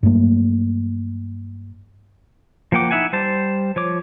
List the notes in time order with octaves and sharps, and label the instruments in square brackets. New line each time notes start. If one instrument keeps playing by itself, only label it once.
[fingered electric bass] G2 F#3 A3 A#3
[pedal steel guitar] F3 A#3 F#5 G5 D6
D#4 E4 E5 F#5 G#5
G3 C5 A5
F3 C#5 D6